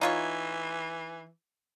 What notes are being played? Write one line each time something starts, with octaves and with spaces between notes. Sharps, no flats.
E3 D#4 F4 C#5